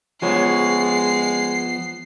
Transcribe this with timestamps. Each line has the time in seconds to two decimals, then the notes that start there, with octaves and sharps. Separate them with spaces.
0.22 F3 G#3 B3 C#5 C7